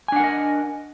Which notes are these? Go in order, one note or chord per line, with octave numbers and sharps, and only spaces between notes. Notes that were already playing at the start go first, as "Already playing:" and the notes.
D4 A#4 D#5 F#5 G#5